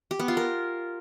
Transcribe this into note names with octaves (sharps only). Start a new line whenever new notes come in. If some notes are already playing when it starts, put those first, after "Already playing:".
G4
B3
F4
A#4